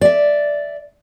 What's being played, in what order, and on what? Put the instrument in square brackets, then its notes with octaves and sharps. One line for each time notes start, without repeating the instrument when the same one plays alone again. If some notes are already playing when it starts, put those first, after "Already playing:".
[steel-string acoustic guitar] D5 E5